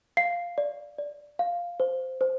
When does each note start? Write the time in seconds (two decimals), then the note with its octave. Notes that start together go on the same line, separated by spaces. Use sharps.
0.17 F5 C7
0.58 D5
0.98 D5
1.39 F5
1.80 C5
2.21 C5